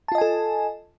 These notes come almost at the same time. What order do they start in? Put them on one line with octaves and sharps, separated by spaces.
A5 F4 D#5 G#5 A4